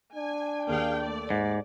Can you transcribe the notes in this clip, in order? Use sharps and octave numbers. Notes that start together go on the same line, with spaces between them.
D4 G#5
D#2 A#3 G#4 F5 G5
A3 D5
G#2